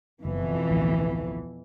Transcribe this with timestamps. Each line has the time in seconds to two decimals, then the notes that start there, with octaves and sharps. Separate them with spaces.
0.25 F#1 F2 B2 E3
0.69 A1 D2